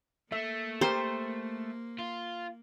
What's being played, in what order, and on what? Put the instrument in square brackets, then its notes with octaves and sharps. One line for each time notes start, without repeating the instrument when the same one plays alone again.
[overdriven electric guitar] A3 [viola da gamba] A#3 [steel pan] E5
[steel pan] G4 A#4 C6 [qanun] C5
[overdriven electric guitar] F4